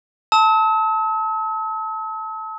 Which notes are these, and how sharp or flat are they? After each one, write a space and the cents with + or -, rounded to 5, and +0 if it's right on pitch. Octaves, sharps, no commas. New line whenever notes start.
A5 +0 E6 -45